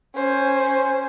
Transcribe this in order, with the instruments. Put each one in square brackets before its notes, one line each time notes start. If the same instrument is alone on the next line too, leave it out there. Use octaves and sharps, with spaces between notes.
[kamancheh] C#4 C5